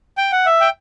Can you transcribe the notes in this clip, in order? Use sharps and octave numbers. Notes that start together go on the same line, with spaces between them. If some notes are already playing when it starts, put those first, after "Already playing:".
G5
F#5
E5
G5